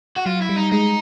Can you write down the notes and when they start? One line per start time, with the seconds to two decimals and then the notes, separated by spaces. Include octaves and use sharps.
0.16 F#4
0.26 F#3 F4
0.42 E4
0.49 G3
0.56 D#4
0.72 G#3 D#4